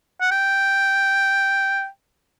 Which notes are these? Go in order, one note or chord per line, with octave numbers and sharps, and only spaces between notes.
F#5
G5